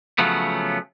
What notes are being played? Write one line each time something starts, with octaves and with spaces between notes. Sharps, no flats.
C#3 F3 F#3 A3 B3